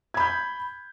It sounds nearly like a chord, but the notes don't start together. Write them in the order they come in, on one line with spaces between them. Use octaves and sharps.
G#6 B5 G6